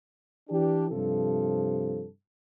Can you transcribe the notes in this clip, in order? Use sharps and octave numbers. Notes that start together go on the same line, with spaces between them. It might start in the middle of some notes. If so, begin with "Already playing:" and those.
E3 D4 G4
G2 C3 F3 A4